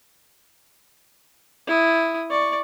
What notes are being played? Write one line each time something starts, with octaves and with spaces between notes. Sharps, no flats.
E4 D#6
D5 C#6